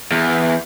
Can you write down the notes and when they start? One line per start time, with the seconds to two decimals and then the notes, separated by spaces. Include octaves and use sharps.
0.12 E2